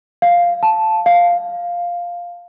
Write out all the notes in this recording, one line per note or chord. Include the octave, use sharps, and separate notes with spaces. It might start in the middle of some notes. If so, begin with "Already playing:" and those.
F5
A5
F5